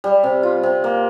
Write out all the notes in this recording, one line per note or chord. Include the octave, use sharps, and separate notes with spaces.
G3
C3
F4
C3
A#3